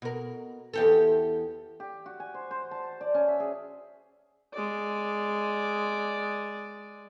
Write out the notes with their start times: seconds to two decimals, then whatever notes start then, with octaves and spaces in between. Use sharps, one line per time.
0.02 B2 A#4
0.73 E2 G4 A4
1.80 G4
2.06 F#4
2.20 G#5
2.34 C5
2.51 C5
2.71 A5
3.01 D5
3.14 C#4
3.28 E5
3.40 G#4
4.53 G#3 D5